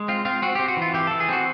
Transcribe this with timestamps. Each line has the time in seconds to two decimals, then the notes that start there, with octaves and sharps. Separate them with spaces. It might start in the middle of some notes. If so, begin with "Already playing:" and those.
Already playing: G#3
0.08 C4 F4
0.25 C4 F4
0.42 C4 F#4
0.55 C4 G4
0.68 F#4
0.77 E3 F4
0.94 E3 G4
1.07 E3 A4
1.20 G#4
1.29 C4 F#4